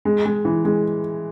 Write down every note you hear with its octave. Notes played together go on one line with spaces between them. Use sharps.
G#3
G#3
E3
G#3